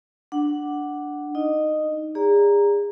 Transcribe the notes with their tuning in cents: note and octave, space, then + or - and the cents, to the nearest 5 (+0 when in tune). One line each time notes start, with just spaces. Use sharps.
D4 +0 F#5 +5
D#4 +0 D#5 -20
G#4 -35 D5 -30 A#5 +0